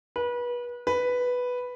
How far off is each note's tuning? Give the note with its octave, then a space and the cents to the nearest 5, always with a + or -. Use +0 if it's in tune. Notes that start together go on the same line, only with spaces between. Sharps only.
B4 -30
B4 +0